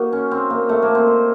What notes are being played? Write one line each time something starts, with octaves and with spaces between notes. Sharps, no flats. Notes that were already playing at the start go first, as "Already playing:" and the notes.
Already playing: A#3 D#4 F#4
C#4
C4
A#3
A3
A#3
C4
D#4